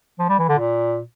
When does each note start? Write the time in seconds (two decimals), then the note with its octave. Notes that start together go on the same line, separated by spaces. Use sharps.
0.19 F3
0.29 G3
0.39 E3
0.49 D3
0.59 A#2